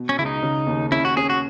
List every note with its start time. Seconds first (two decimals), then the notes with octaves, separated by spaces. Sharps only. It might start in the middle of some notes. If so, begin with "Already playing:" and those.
Already playing: B2
0.09 C#4
0.18 C#2 E4
0.26 D#4
0.42 C#3
0.67 D#2
0.92 C#4 E4
1.05 F#4
1.17 C#4 G#4
1.30 F#4